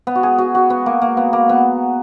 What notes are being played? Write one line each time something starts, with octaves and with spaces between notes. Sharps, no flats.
B3
F#4
G#4
F#4
F#4
B3
A#3
A#3
B3
A#3
B3